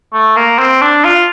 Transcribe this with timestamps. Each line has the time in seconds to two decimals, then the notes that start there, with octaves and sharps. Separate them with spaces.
0.13 A3
0.36 A#3
0.59 C4
0.82 D4
1.04 F4